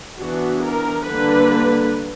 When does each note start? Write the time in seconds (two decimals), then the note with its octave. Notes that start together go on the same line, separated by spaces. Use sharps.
0.19 E3 B3 D4 F#4
0.64 A#4
1.08 D3 G3 A#3 D4 B4